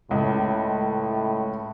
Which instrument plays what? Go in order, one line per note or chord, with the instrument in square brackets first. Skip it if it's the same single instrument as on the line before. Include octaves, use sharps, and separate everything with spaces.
[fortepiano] C#2 [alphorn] A2